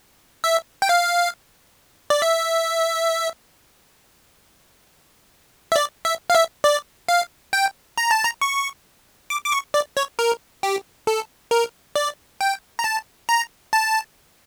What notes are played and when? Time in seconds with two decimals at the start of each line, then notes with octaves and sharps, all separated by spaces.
0.44 E5
0.82 G5
0.89 F5
2.10 D5
2.22 E5
5.72 E5
5.76 D5
6.05 E5
6.30 F5
6.35 E5
6.64 D5
7.09 F5
7.53 G5
7.98 A#5
8.11 A5
8.24 A#5
8.41 C#6
9.30 D6
9.46 D6
9.52 C#6
9.74 D5
9.97 C#5
10.19 A#4
10.63 G4
11.07 A4
11.51 A#4
11.96 D5
12.41 G5
12.79 A#5
12.84 A5
13.29 A#5
13.73 A5